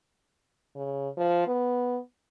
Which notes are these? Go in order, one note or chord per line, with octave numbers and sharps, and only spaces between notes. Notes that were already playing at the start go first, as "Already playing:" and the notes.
C#3
F3
B3